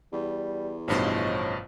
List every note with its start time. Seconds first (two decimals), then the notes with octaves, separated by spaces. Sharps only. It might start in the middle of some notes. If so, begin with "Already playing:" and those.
0.13 E2 G3
0.88 A1 G2 B2 F3 C#4 D#4 C5